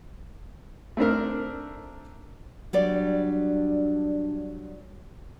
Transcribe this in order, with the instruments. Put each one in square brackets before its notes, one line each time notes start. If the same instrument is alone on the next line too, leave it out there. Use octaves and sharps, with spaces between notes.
[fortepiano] A3 C4 D4 A#4
[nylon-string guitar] F#3 G3 D5 [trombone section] D4